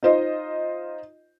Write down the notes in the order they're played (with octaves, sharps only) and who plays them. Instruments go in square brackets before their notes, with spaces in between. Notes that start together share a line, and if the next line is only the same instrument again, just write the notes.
[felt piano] D#4 F4 C5 D#5